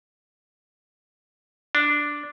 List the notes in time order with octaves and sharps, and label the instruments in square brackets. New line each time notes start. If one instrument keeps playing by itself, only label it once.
[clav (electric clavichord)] D4